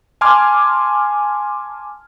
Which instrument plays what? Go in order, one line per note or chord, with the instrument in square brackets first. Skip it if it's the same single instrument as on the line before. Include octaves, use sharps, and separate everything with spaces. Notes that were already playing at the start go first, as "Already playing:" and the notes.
[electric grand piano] G#5 A5 C6 D6 F6 G#6